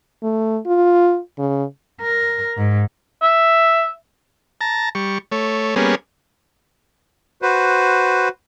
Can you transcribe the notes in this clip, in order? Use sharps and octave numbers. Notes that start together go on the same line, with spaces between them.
A3
F4
C#3
A#4
G#2
E5
A5 A#5
G3 C#6
A3 C#5
G3 A#3 B3 C#4 G#4
F#4 B4 C5